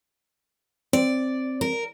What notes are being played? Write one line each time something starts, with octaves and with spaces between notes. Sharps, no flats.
C4 D5
A#4